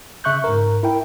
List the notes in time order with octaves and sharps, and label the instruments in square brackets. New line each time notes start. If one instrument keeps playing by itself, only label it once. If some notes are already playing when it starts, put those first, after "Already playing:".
[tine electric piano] C#3 E5 C#6 F#6 G6
G#2 A#4
E4 A#4 G5